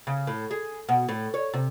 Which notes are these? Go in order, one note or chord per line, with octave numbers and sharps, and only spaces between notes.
C#3
A2
G#4
B2
A2
C#5
C3